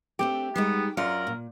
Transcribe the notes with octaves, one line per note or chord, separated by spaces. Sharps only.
A3 C4 D4 G4
G3 G#3 B3 D#4
F#2 F4 A#4 D5
A#2